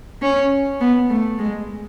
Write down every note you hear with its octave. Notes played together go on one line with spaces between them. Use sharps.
C#4
B3
A3
G#3